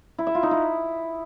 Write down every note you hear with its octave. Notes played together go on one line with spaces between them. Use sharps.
E4
E5
F4
D#4
E4